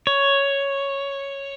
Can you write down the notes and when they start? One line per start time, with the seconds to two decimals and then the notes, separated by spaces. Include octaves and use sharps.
0.07 C#5